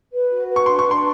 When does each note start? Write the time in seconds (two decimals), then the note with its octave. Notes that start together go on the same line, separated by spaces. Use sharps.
0.10 B4
0.29 F#4
0.47 B4
0.56 C#6
0.66 D4 C6
0.79 C#6
0.85 D4
0.91 C6